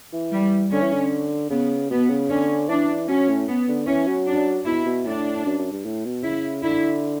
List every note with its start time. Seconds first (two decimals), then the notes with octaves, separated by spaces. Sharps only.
0.13 E3
0.32 G3
0.72 D3 C#4
0.82 E3
0.93 D3
1.50 C#3 B3
1.90 B2 B3
2.10 C#3
2.29 D3 C#4
2.69 E3 D4
3.09 F#3 C#4
3.29 A2
3.48 B3
3.68 D3
3.87 E3 C#4
4.07 F#3
4.27 D4
4.66 B2 E4
4.86 B2
5.06 A2 D4
5.45 F#2
5.58 F#2
5.72 G2
5.85 A2
6.05 B2
6.24 C#3 E4
6.63 D3 E4